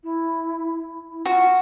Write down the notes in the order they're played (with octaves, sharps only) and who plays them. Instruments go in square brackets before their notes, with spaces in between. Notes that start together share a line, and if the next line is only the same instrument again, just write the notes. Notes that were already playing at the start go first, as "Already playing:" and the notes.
[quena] E4
E4
[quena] F4 [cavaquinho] F#4